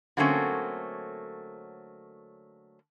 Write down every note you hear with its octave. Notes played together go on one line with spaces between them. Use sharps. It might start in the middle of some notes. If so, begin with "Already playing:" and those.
D3 F#3 A3 A#3 C4 C#4